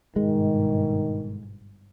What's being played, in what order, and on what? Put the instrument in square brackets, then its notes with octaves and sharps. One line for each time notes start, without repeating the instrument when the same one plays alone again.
[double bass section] G1 G#2 B2 [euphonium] D#3 [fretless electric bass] G#3